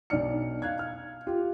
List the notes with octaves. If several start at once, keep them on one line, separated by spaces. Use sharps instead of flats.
B1 D4 D#4 D5 F6 C#7
F5 F#6 G#6
F6
F4 G4